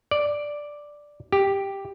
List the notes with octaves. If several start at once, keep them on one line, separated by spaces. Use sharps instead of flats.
D5
G4